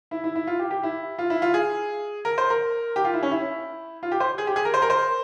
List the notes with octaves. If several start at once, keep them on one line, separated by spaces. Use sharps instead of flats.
E4
E4
E4
F4
G4
G4
E4
F4
E4
F4
G#4
A#4
C5
A#4
G4
F4
E4
C#4
E4
F4
G4
C5
G#4
G4
G#4
A#4
C5
A#4
C5